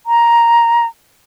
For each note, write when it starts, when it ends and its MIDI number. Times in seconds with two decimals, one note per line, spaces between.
0.06 0.86 82